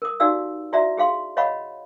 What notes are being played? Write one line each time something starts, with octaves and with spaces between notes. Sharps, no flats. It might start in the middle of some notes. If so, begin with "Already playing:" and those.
A#4 D#6
D#4 F#4 G4 D5 F5 E6
E4 F#4 D5 E5 A#5
G4 G#4 F5 C6
C#5 D#5 F5 F#5 B5 C#6